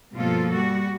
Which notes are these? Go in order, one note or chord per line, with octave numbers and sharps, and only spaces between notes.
G2 B2 F3 A#3 F4 A4
G3 F#4